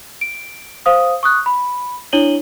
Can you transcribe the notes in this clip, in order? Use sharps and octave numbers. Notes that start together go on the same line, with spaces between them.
D7
C5 F5 D#6
C#6 D#6 F#6
B5
D4 E4 C#5 D#7 F#7 G7